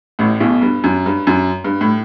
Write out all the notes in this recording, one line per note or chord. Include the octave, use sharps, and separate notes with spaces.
A1 A2
B1 B2
G2
F#2
G2
F#2
G2
A2